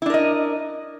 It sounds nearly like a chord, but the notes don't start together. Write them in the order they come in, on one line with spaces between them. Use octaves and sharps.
E4 D4 A#4 D#5